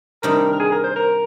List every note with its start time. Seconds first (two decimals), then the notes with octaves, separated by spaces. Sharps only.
0.23 C3 D#3 G3 D4 A#4
0.52 A#4
0.60 G#4
0.72 A#4
0.84 C5
0.96 A#4